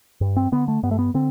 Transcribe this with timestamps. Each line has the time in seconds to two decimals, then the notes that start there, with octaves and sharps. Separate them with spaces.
0.21 G2
0.36 C4
0.52 D3 B3
0.68 A3
0.83 G2 B3
0.91 A3
0.99 B3
1.14 D3 C4